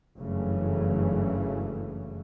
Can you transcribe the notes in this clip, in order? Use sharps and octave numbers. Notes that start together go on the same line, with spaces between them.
F#1 G2 C#3 E3 F#3 A3